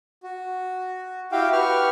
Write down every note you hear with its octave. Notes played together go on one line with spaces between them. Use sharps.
F#4
E4 F#4 G4 F5 G5
G4 B4 F#5 C#6 F6